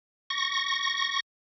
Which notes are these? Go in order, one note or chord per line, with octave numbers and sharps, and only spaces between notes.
C#6 A#6